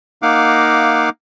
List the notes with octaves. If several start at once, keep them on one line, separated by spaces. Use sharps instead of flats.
A#3 D#4 F5 F#5 D6